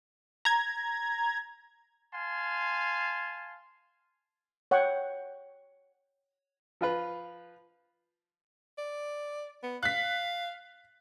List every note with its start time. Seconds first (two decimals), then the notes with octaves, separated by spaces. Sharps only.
0.45 A#5 G#6
2.14 F5 G#5 A5 C6
4.71 C#5 F#5 G5 C#6
6.81 F3 F4 B4
8.78 D5
9.63 B3
9.83 F5 F#6 B6